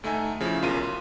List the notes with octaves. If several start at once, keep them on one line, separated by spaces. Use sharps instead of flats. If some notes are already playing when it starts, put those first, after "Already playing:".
D2 A3 D#4 E5 G#5
C#3 F3 E4
B1 C#4 F4 A#4 D#7
C6